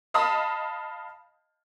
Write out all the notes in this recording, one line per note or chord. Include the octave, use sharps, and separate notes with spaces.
D#5 F5 A5 B5 D#6